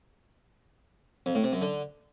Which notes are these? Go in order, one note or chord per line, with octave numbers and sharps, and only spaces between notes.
F2
A2
C3
F#2
D3